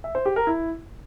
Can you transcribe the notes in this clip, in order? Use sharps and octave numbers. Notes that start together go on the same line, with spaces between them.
E5
C5
G4
A#4
E4